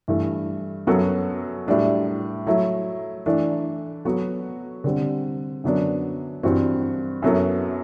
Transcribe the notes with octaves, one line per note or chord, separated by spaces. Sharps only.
G2 E3 A3
F#2 F#3 B3 F#4 A4
A2 G3 D4 F#4
F#3 A3 E4
E3 A3 D4
F#3 B3 F#4 A4
D3 G3 C4
F#2 D3 F#3 B3 D4
G2 E3 G3 C4 F#4
F#2 F#3 B3 E4 A4